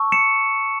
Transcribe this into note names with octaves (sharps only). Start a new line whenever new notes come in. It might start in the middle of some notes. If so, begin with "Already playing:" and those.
Already playing: A5 C#6 E6
C#7 E7